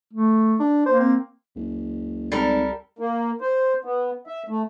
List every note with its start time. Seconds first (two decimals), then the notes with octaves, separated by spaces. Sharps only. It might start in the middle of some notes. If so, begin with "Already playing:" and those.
0.13 A3
0.59 D4
0.86 A#3 C5
1.00 C4
1.56 F#1 C#2
2.32 G#1 G3 A4 A#4
2.99 A#3
3.41 C5
3.85 B3
4.27 E5
4.49 A3